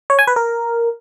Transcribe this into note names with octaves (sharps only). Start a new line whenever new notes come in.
C#5
G#5
B4
A#4